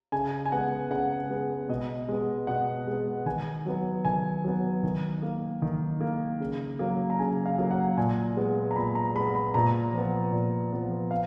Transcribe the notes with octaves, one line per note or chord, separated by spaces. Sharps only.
C#3 G#5
G#5
G#3 B3 F#5
C#3 F#5
G#3 B3
B2 D#5
G#3 B3
B2 F#5
G#3 B3
D#3 G#5
F#3 B3
D#3 G#5
F#3 B3
D#3
A#3
D#3
A#3
C#3
F#3 A#3
A#5
C#3 G#5
F5
F#3 A#3
F#5
A#2 G#5
G#3 B3
A#5
A#2 B5
A#5
G#3 B3 B5
B5
A#2 A#5
F3 B3
A#2
F3 B3
F5